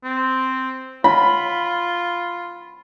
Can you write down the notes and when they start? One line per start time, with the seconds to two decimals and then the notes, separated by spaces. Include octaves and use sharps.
0.04 C4
1.04 F4 B5